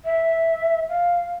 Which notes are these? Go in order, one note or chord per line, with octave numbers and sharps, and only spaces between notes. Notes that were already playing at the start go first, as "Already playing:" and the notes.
E5
F5